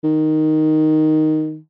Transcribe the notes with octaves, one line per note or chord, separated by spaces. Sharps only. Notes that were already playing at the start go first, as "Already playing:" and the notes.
D#3